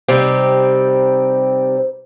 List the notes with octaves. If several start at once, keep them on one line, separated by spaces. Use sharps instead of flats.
C3 G3 C4 D#4 G4